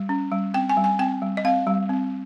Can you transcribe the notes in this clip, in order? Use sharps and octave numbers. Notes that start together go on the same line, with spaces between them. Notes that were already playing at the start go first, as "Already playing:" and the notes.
Already playing: G3
C#4
G3
C4 G5
G#5
G3
G#5
C4 G5
G3
D#5
C4 F5
G3
C4